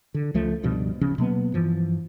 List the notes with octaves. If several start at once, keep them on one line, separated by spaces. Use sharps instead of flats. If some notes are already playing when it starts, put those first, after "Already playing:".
D3
C#2 F3 A3
C#2 G2 B2 F3
D#1 C#3 F3 C#4
B2 F#3 A#3 B3
G2 E3 F3